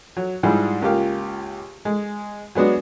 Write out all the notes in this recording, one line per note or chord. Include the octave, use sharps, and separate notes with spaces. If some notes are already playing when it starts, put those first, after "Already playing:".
F#3
G#2 F3 G3 E4 G#4
C#2 A#3 F4 G4 F5
G#3
F#3 G#3 B3 D4 F#4